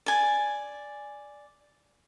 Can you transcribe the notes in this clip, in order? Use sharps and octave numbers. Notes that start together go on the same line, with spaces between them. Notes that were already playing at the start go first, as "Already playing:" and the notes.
D5 G#5